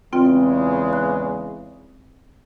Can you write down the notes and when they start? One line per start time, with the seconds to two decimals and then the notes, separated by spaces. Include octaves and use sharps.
0.13 E2 C#3 G#3 C4 F4 G5
0.93 F#6